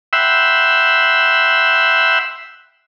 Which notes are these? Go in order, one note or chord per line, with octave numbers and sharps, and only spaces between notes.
E5 F#5 G5 B5 C6 E6